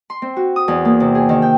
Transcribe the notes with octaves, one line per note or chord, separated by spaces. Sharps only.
C6
C4
F#4
D#6
E2
A#3
C3
G#4
D#3
G5